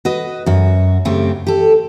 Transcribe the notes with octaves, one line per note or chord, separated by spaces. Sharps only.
F#4 B4 D#5
F#2 F#4
F#2 C#3 A3 C4 G4
G4 A4